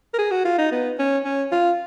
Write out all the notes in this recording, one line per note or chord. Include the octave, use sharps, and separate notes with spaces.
A#4
G#4
F#4
F4
D#4
B3
C#4
C#4
F4